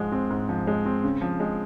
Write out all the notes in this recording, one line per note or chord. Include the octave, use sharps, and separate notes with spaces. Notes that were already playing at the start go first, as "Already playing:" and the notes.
Already playing: G#2 F3 G#3
C4
G#2
F3
G#3
C4
C#3
F3
G#3